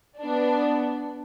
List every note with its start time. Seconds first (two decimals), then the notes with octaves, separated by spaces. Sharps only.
0.20 B3 D4